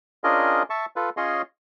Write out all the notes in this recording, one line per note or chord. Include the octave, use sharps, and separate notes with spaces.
C#4 D4 F4 G#4 A#4 D#5
E5 A5 C#6
F4 A4 B4
C#4 F4 G#4 C#5 D#5 C6